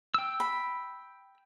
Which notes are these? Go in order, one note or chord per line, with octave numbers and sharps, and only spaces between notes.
G5 E6
B5